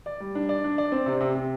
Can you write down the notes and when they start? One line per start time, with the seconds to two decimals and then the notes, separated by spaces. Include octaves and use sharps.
0.06 D5
0.20 G3
0.35 D4
0.49 D5
0.64 D4
0.78 D5
0.92 C4
1.06 C3
1.21 C3
1.35 C3